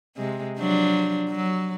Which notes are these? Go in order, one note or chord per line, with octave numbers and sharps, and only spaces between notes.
C3 G#3
F3 F#3 D4
F#3